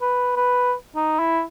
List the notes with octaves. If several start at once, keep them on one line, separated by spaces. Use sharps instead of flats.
B4
B4
D#4
E4